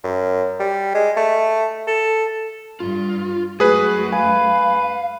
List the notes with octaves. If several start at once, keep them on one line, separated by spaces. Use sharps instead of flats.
F#2
G3
G#3
A3
A4
G2 F4
F#2 G#3 A3 F#4 G#4 B4
B4 F5 G#5